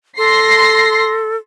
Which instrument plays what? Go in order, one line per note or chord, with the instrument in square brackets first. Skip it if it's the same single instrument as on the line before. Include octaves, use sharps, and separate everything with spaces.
[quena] A4 [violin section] C6 A#6 C7